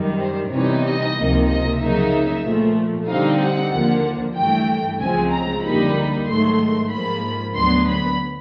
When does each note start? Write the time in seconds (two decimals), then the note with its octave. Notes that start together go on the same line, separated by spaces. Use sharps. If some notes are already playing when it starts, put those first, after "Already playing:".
Already playing: F#2 D#3 G3
0.20 C5
0.51 C3 E3 G3 B3 D#4 C#5
0.84 D#5
1.16 C#2 C3 F3 A#3 D#4
1.48 D#5
1.79 F2 C#3 F#3 A#3 D#4 E5
2.44 A#2 F3 A3
3.07 D3 G3 C4 D#4 F5
3.39 F#5
3.71 D#2 D3 F3 A#3
4.36 G2 E3 A3 G5
5.00 C#2 C#3 F3 G#3 C4 G#5
5.32 A#5
5.64 F2 D3 G3 A#3 D#4 B5
6.27 G#2 D#3 F#3 A3 C6
6.91 G#2 F3 A#3 B5
7.56 D2 D3 F#3 B3 C6
7.88 B5